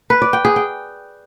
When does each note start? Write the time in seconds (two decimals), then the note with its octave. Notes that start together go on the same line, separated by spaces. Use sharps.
0.10 B4
0.22 D5
0.33 G5
0.45 G#4
0.56 G5